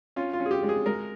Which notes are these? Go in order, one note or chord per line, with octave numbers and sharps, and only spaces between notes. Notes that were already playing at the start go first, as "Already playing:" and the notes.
C#4 F4
F4
C#4
G#4
G4
G#3
G#4
G#3 A#4